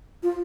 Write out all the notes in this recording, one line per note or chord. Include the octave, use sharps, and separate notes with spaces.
F4